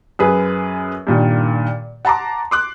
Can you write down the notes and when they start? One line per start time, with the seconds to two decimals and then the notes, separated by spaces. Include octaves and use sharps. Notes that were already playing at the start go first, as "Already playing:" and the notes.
0.19 F#2 G#4 B4
1.07 G2 A#2 D#3
2.05 F#5 A5 A#5 C6 D6
2.51 C6 D6 F#6